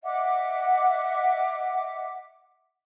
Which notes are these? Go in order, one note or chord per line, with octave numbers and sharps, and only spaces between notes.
D#5 E5 F#5 D6